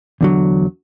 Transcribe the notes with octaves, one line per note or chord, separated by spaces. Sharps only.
E2 D3 F#3